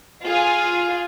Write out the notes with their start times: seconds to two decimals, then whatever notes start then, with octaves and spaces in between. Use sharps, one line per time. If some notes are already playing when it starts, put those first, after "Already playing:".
0.24 F4 G#4